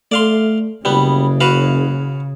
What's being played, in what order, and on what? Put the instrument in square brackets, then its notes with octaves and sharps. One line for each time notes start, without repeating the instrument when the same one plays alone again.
[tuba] A3 [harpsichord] D5 F5 C6
[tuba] F#1 [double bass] C#3 [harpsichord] G3 B3
[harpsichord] F#4 B4 F5